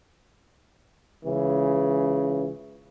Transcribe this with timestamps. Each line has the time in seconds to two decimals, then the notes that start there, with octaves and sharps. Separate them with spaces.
1.25 C#2 C#3 E3